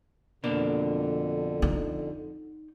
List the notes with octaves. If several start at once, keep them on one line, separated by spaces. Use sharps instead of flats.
F2 B2 D3 A#3 D4
D#4